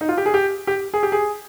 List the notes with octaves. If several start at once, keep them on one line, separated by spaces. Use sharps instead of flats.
D#4
F4
G4
G#4
G4
G4
G#4
G4
G#4